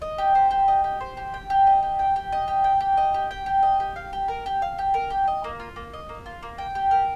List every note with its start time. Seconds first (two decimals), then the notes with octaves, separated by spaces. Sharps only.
0.02 D#5
0.18 G4
0.35 C5
0.51 G4
0.68 D#5
0.84 G4
1.01 C5
1.17 G4
1.34 G5
1.50 G4
1.67 D#5
1.83 G4
1.99 G5
2.16 G4
2.32 D#5
2.48 G4
2.64 G5
2.80 G4
2.97 D#5
3.14 G4
3.31 G5
3.46 G4
3.63 D#5
3.80 G4
3.96 F5
4.13 G4
4.28 A#4
4.46 G4
4.62 F5
4.78 G4
4.94 A#4
5.10 G4
5.27 D#5
5.44 A#3
5.60 F4
5.76 A#3
5.93 D#5
6.09 A#3
6.26 F4
6.43 A#3
6.58 G5
6.75 G4
6.91 A#4